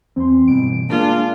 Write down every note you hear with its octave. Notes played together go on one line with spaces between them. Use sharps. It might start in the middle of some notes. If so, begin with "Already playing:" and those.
E2 C4 C6
G2 B2 E3 D7
G#3 A#3 D4 F4 G#4 A#4 A5